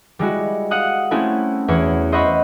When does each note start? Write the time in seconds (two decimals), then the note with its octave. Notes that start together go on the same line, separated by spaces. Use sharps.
0.19 G3 G#3 E4 F#4
0.71 F5 F#5 D#6 F#6
1.11 A3 C4 C#4 E4 F#4 A4
1.68 E2 E4 C#5
2.12 C5 D#5 E5 F#5 B5 C#6